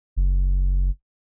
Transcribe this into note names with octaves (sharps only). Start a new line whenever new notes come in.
F#1